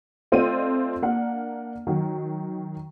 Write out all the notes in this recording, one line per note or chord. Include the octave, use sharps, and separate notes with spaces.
A3 C4 F4 D5 D#5 D#7
A#3 D4 F#5
D#3 F#3